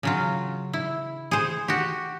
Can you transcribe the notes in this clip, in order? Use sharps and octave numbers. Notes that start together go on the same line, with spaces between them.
C#3 F#3 F4
E4
G#4 C5
F#4 G4